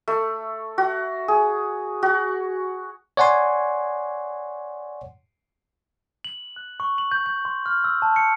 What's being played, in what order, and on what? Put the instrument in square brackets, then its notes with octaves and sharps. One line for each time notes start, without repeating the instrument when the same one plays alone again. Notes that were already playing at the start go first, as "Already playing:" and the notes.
[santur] A3
F#4
G#4
F#4
[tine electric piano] C#5 D5 F#5 G#5 C6
[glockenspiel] F#7
F#6
C#6
F#7
G6
G6
C6
F6
E6
A5
C#7